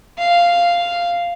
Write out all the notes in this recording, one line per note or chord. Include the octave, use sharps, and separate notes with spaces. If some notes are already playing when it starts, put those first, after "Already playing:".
F5